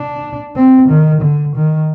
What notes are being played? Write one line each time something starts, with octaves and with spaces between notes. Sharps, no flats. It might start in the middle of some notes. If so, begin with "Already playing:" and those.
Already playing: D4
C4
D#3
D3
D#3